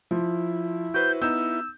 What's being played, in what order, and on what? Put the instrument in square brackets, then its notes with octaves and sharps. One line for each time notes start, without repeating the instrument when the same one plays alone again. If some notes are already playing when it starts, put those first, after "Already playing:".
[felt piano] F3 [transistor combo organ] E4
[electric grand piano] F#4 B4 C5 [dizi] G6
[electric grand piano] B3 D#4 [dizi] E6 [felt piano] G6